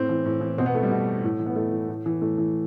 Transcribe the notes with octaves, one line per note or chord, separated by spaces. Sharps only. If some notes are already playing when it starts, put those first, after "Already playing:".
Already playing: A2 C4
E3
A2
E3
B2 C4
B3
A3
G3
B2
A2
E3
B3
A2 A3
E3
A2
E3
A2 A3
E3